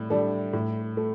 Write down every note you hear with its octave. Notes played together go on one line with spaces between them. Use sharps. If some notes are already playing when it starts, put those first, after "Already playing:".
Already playing: A2 G3
G3 D4 A4
A2
A3